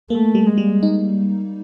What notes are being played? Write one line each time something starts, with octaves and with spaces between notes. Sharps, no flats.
A3 A#3
G3
G#3
G3
D#4